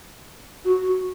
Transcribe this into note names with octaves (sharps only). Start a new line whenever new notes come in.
F#4
F#4